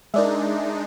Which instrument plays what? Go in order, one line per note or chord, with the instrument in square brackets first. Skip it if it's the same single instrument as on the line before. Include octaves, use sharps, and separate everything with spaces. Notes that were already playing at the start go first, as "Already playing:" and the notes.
[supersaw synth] G#3 D4 D#4 [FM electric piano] A#4 D5 E5